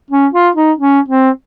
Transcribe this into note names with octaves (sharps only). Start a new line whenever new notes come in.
C#4
F4
D#4
C#4
C4